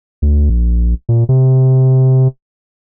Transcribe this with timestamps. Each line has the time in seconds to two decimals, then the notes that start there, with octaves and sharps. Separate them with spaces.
0.22 D2
0.50 A#1
1.09 A#2
1.29 C3